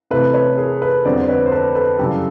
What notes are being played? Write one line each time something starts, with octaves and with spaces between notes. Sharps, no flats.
C3 E3 A3 A4 B4
B4 C#5
G#4 A#4
A4 B4
F2 D3 G3 B3 C5 D5
C5
B4 C#5
C5
A4 B4
A4 B4
F#2 C#3 E3 G3 G4 A4